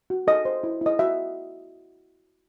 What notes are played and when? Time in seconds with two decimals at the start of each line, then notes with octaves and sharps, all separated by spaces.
0.10 F#4
0.27 A4 D#5
0.45 C5
0.64 E4
0.81 E4 D#5
0.99 F#4 E5